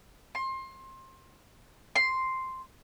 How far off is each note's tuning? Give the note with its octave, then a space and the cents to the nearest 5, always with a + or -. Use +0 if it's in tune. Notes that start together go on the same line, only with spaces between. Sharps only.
C6 +25
C6 +0